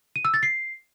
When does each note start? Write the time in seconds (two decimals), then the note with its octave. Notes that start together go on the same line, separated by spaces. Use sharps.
0.16 D#7
0.25 E6
0.34 A6
0.43 C7